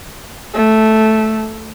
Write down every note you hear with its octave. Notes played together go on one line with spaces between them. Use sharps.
A3